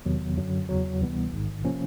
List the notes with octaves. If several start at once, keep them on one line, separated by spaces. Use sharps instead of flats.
E2 C3 D#3 F#3 B3
F#2 D3 F#3
E2 C#3 F#3
D2 C3 E3 G3 B3
A1 G#2 D#3
C3 F3 A#3 C#4